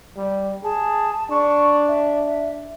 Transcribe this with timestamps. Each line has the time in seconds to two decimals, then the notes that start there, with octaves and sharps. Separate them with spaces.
0.17 G3
0.64 G#4 A5
1.30 D4 C#6
1.88 E5